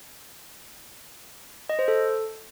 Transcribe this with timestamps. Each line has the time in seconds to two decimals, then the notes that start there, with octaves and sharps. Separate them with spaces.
1.69 D#5
1.79 C5
1.88 A4